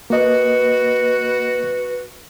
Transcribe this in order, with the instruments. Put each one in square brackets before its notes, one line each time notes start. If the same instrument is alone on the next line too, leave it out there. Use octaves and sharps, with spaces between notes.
[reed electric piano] A#3 D#5 [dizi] F#4 [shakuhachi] B4